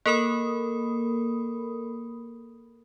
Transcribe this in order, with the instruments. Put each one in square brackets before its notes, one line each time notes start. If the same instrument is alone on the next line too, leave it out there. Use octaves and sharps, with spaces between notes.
[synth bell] A#3 A4 A#4 B5 D#6